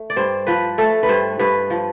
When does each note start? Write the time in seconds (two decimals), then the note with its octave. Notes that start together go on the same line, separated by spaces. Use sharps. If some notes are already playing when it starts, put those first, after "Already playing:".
Already playing: A3
0.10 D5
0.16 G2 C5
0.47 F3 B4
0.78 A3 A4
1.03 B4
1.09 G2 C5
1.39 G2 B4
1.70 F3